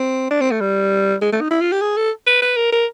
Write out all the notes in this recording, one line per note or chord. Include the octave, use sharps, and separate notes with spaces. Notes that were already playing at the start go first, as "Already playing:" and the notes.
Already playing: C4
D4
C4
A3
G3
G#3
A3
D#4
E4
F4
G4
G#4
A4
B4
B4
A#4
A#4